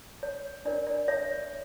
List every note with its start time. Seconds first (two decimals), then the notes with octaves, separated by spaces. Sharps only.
0.23 C#5
0.65 D4 A#4 C#5 D5
0.87 D5
1.08 C#5 E5